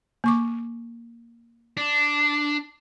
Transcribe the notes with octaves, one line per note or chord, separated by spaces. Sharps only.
A#3 C#6 D6
D4